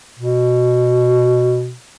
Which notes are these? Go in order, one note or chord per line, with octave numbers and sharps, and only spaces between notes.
B2